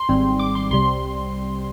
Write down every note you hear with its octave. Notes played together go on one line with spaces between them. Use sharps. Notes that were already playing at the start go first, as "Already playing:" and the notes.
Already playing: C6
G#1 G#2 G3 C4
D6
C6
C2 C3 G3 C6